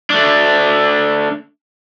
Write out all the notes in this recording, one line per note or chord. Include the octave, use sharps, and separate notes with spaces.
A3 D4